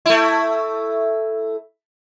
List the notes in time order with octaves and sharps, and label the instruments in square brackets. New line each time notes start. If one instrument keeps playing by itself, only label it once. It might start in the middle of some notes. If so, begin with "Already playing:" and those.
[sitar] A3 E4